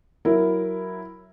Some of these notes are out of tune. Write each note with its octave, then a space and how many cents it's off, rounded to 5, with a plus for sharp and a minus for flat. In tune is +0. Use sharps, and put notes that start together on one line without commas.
F#3 +5 E4 +0 A#4 +0